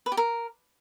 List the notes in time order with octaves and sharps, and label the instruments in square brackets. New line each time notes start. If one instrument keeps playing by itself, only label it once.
[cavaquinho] B4
G4
A#4